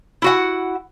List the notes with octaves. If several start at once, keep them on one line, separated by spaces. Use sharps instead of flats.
E4 F#4 F#5